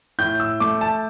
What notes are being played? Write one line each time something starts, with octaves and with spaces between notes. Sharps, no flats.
A2 G6
E6
A3 D6
A5